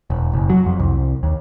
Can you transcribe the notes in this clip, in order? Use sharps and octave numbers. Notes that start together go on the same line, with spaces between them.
E1
F#1
F#3
F2
C2
D#2